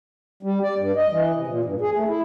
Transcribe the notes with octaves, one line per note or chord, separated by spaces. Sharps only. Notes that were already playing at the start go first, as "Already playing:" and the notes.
G3
D5
G2
D#5
E3
C3
A#2
G2
G#4
A3
E4